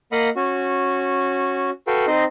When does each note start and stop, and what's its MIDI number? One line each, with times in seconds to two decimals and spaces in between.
0.12 0.29 58
0.12 0.29 75
0.12 0.29 77
0.12 0.29 78
0.12 0.29 83
0.12 0.29 87
0.36 1.70 61
0.36 1.70 66
1.87 2.06 66
1.87 2.06 69
1.87 2.06 71
1.87 2.06 77
1.87 2.06 79
2.07 2.24 60
2.07 2.24 63
2.07 2.24 72
2.07 2.24 75